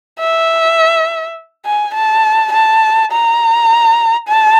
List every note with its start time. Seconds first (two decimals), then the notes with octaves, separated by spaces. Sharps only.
0.19 E5
1.66 G#5
1.95 A5
2.53 A5
3.12 A#5
4.29 A5